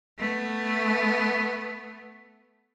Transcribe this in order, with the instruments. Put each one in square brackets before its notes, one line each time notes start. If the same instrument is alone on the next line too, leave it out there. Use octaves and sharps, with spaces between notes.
[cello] A3 B3